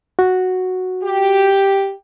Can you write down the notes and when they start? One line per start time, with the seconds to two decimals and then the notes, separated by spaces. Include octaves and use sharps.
0.19 F#4
1.03 G4